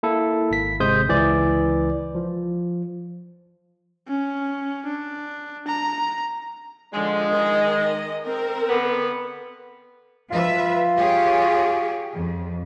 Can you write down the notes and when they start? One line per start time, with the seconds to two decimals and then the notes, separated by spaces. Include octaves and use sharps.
0.03 A#3 E4 A4
0.51 G#1 B6
0.80 G#1 C3 G#3 C5 D#6 G6
1.08 C#2 E3 D5
2.15 F3
4.08 C#4
4.86 D4
5.67 A#5
6.93 D3 F3 G#3
7.31 D#3 D#5
8.24 C4 A#4
8.69 D3 B3
10.30 F3 F4 B4 E5
10.96 G4 G#4 C#5
12.15 F2